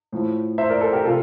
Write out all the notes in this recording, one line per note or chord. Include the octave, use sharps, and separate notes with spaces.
A2 F3
C5 E5
A#4 D5
A4 C5
G4 A#4
C3 F4 A4